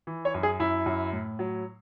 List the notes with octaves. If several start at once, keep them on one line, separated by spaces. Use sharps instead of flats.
E3
C#5
F#2
G#4
F#2 E4
F#2
A2
F#3